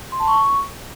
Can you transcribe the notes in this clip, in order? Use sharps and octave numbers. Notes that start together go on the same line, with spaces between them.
C6
A5
C#6